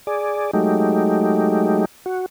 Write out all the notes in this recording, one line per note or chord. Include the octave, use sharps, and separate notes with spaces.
G#4 D5
F#3 G#3 A3 D#4 G4
F#4